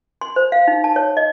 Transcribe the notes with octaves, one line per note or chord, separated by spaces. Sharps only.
C6
C5
F5
D#4
A5
C#5
D#5